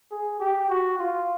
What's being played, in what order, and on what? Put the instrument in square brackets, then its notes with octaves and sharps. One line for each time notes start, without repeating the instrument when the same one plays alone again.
[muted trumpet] G#4
G4
F#4
F4